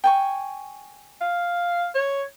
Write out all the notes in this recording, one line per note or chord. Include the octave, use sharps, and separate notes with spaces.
G5 G#5 C#6
F5
C#5